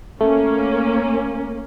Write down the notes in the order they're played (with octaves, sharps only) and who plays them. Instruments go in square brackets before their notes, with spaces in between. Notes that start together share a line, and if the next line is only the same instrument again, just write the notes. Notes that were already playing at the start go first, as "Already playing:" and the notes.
[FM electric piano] A3 [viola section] A#3 C#4